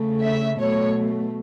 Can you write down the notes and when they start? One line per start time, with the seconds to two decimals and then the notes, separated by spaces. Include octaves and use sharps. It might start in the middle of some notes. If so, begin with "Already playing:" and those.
Already playing: C#3 A3
0.21 E5
0.59 B2 F#3 A3 C#5